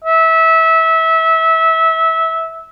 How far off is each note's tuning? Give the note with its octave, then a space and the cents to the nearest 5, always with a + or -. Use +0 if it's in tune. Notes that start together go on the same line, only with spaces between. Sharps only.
E5 -20